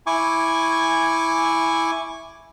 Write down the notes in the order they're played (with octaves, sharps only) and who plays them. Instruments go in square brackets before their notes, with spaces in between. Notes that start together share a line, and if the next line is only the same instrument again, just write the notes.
[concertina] E4 G#5 C#6 D6